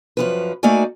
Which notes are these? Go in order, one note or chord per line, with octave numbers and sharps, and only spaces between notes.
F#2 F3 B4
A3 A#3 D#4 F#4 D5 G#5